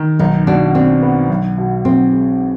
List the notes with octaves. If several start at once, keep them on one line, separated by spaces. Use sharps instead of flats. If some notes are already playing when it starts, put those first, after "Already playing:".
Already playing: D#3
B1 D#4
B2 D4
C4 D4
B3
B1
B2
B1 C4
G#3